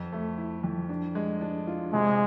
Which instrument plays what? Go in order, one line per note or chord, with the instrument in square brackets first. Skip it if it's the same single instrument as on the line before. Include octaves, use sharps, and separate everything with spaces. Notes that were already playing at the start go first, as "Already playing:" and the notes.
Already playing: [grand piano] F2
A3
E4
F2
D4
G#3
D4
F4
[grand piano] C3 [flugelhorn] G#3